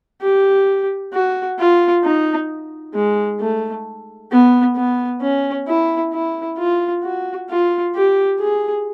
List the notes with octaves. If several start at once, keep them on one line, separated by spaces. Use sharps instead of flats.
G4
F#4
F4
D#4
G#3
A3
B3
B3
C#4
E4
E4
F4
F#4
F4
G4
G#4